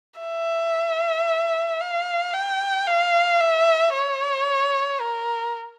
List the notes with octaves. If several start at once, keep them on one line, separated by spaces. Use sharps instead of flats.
E5
F5
G5
F5
E5
C#5
A#4